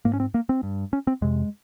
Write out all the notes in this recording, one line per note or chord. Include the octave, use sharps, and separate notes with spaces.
G#2 A#3
C#4
C4
A#3
C4
G2
C#4
C4
F2 C3 G#3